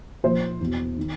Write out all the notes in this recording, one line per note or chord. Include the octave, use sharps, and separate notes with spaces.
A#2 F3 C5
E2 B2
D#3